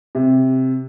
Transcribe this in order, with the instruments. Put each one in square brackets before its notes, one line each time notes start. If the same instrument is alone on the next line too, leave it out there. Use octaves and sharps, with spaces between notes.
[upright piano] C3